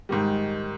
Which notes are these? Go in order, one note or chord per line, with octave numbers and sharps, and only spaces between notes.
G#2 D#3 G3